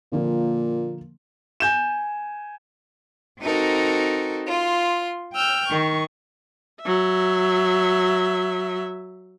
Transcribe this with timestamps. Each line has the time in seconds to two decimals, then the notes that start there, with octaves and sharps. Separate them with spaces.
0.12 A#2 D3 F3 A#3
1.60 G#5 G6 E7
3.42 C4 D#4 F#4 A4 A#4
4.47 F4 C6
5.34 G5 E6 F6 G6
5.68 D#3 C#6
6.82 F#3 E5